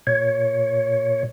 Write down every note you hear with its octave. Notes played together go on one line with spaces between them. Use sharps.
A#2 C#5